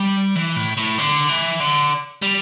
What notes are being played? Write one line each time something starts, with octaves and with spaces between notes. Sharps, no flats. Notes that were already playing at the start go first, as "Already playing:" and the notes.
Already playing: G3
E3
A2
A2
D3
E3
D3
G3